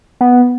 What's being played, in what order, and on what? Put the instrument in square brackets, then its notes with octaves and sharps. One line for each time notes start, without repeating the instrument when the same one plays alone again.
[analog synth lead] B3